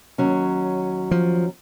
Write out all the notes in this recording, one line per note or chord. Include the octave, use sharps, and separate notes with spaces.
D#2 F#3 C#4
F3